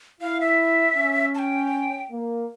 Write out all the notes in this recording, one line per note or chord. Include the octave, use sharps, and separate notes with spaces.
E4 F5
E5
C#4
A5
G5
A#3